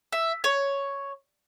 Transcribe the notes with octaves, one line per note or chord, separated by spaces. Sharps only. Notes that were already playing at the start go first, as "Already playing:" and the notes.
E5
C#5